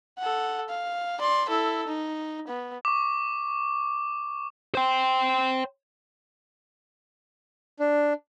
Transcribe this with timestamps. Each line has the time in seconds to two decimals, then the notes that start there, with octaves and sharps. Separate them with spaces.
0.19 A4 F#5
0.69 F5
1.19 D5 C6
1.49 E4 A4
1.87 D#4
2.48 B3
2.85 C#6 D6
4.75 C5 G5
7.80 D4